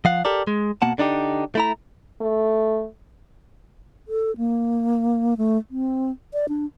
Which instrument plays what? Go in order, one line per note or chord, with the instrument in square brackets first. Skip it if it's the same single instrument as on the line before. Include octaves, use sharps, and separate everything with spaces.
[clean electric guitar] F3 F5 F#5
G4 A4 A#4 D5
G#3
B2 A#3 F#5 A5
D3 D4 D#4 G4
A3 E4 A#5
[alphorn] A3
[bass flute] A4
A#3
A3
C4
D5
D4